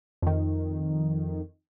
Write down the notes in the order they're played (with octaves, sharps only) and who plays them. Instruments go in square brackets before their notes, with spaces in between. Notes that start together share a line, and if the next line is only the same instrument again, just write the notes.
[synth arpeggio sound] F2 D#3